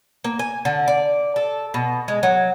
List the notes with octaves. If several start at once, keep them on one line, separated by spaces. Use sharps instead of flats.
A#3
G#5
D3
D5
A4
B2
G#3
F#3